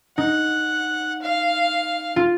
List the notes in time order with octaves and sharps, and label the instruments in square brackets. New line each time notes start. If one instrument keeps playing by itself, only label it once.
[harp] D#4 [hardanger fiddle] F#5
[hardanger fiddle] F5
[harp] F4